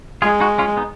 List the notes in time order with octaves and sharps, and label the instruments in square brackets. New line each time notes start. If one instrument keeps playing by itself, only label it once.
[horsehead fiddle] G#3 [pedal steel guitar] F4 G#4
[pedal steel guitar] D#4 F#4
C#4 F4
B3 D#4